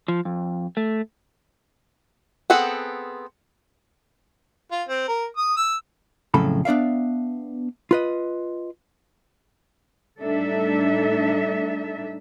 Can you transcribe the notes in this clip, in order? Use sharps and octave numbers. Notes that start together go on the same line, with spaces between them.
F3
F2
A3
B3 C4 G#4 A4 F#5
F4
C4
A#4
D#6
E6
F2 A2 C#3 F#3 A4 B5
B3 D4 D5 E5 F5
F4 B4 D#5
A2 G3 D4 D#4 A4 E5